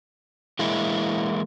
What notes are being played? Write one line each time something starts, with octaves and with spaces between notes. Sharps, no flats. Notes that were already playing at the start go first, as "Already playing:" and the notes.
E3 G#3 A#3 E4